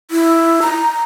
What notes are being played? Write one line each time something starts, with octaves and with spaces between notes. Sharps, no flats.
E4
A#5